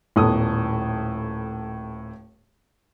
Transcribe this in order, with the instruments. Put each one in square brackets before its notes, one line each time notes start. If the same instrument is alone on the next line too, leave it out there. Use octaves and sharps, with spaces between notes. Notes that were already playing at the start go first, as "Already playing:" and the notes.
[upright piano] D#1 A2 B3 A4 D#6